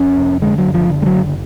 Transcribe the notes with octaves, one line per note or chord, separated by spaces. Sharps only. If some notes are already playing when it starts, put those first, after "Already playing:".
Already playing: F2 C#4
F1
D3 G#3
F#3
F#1
F3
D3
G#3
F#3
F#1